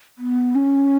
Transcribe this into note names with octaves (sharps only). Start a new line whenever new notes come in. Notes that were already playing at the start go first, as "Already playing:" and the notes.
B3
C#4